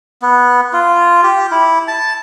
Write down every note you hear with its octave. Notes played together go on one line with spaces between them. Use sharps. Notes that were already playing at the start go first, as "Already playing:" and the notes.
B3
F4
G4
E4
A5